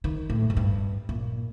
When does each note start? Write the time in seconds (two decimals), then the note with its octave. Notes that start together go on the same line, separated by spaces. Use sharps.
0.04 D#3
0.30 A2
0.50 G#2
0.57 G2
1.09 A#2